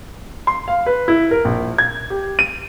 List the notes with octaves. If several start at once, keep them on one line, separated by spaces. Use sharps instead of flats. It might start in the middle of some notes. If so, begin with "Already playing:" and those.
C6
F5
B4
E4
A#4
A#1
G#6
G4
D#7